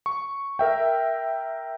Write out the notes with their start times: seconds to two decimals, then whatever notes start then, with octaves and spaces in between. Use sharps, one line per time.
0.06 C#6
0.59 A#4 E5 G5